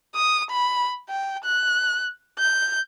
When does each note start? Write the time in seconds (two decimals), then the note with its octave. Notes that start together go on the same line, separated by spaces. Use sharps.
0.15 D#6
0.50 B5
1.09 G5
1.44 F#6
2.39 G6